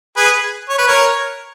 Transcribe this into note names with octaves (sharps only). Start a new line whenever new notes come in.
G#4 B4
C#5
B4
A#4 C#5